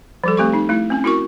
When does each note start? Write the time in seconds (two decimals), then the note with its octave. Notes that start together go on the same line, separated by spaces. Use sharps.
0.24 F3 G3 A4
0.37 A3 C4 G4 C#6
0.53 D#4
0.69 A3 E4
0.90 C4 C#4
1.04 E4 F#4 A#4 C#6